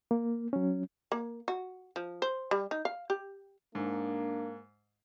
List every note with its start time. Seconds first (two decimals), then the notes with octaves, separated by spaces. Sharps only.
0.11 A#3
0.53 F#3 C#4
1.12 A#3
1.48 F#4
1.96 F3
2.22 C5
2.51 G3
2.71 D#4
2.85 F5
3.10 G4
3.75 G#2 A#3 D4